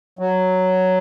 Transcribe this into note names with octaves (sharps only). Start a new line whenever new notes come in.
F#3